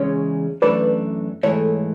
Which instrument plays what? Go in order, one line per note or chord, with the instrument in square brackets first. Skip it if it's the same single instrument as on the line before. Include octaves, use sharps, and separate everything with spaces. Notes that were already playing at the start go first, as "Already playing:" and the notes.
Already playing: [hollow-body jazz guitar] E2 C#3 G#3 C#4 [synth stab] C#5
[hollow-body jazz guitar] F#2 E3 A3 D4 [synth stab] B4 D5
[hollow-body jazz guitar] G#2 E3 A3 E4 [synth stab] A4 C#5